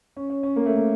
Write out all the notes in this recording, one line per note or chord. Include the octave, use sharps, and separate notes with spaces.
C#4
C#4
C#4
A#3
A3
A#3